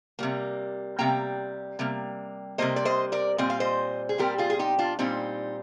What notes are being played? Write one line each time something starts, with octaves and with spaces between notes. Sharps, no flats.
C3 G3 A#3
C3 G3 A#3 G5 A#5
C3 G3 A#3
C3 G3 A#3 C5 D#5
D5
C5 D#5
A#4 D5
A#2 G3 C4 D#5
F5
C5 D#5
G#4
A#2 G3 C4 G4 A#4
F4 G#4
G#4
D#4 G4
D4 F4
A#2 G3 C4 D#4